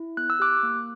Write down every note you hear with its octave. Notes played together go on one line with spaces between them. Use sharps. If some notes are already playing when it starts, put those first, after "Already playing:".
Already playing: E4
B3 F#6
E6
G4 D6 F#6
A#3